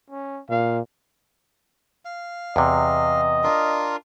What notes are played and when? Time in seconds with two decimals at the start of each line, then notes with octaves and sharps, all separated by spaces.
0.10 C#4
0.50 A#2 F5
2.05 F5
2.56 E2 C3 D#5
3.44 D4 F4 A#4